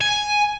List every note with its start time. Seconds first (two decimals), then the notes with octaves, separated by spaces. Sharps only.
0.01 G#5